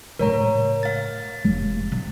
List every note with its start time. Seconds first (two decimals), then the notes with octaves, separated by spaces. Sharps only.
0.19 A2 C#3 A#4 C#5 A#5
0.83 F5 A6
1.44 F1
1.92 C3